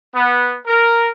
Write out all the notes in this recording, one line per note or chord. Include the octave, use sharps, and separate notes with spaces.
B3
A#4